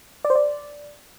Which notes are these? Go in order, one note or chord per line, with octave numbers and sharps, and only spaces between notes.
D5
C5
D5